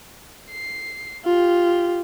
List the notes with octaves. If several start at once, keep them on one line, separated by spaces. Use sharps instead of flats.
C7
F4 G4